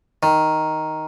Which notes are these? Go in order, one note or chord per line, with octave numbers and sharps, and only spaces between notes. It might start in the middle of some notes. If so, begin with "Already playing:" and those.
D#3